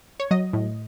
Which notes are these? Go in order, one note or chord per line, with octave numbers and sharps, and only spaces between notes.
C#5
F#3 D#5
A2